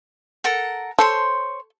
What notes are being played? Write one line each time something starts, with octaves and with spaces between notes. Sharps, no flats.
A4 A#4 F#5
A4 C5 C#5 C6